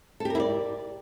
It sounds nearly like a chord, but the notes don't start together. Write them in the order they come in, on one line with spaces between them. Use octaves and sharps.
A4 G4 A#4 E4 D5